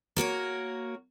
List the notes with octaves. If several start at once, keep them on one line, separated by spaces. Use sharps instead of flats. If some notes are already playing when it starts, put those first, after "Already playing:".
A#3 F#4 A#4 C#5